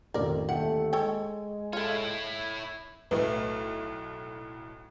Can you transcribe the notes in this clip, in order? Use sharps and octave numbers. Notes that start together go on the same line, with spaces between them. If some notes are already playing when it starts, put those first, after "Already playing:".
A1 F2 D#3 A#4 D5
G1 D#2 A3 F#5 G5 C#7
G#3 A4 C#5 G5 G#5
E4 F4 A4 C#5
B1 A2 A3 B4